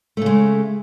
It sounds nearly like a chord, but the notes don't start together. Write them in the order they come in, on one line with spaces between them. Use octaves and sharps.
A3 C#3 G#3